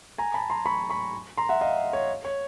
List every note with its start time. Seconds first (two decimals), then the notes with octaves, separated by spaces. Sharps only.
0.18 G#5 A#5
0.34 A5 B5
0.50 A#5 C6
0.66 B5 C#6
0.90 B5 C#6
1.37 A#5 C6
1.49 E5 F#5
1.61 D#5 F5
1.93 C#5
2.25 C#5